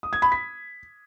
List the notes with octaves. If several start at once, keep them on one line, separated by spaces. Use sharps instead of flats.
D#6
G#6
B5
B6